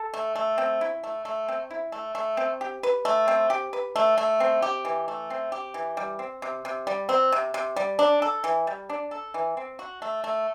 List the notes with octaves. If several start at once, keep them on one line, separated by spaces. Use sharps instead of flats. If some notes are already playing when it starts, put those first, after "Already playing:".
Already playing: A4
A3
A3
C4
E4
A3
A3
C4
E4
A3
A3
C4
G4
B4
A3
C4
G4
B4
A3
A3
C4
G4
E3
A3
C4
G4
E3
G3
C4
C3
C3
G3
C4
C3
C3
G3
D4
A4
E3
G3
D4
A4
E3
C4
F#4
A3
A3